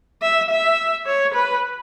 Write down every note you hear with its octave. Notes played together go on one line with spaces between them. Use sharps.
E5
E5
C#5
B4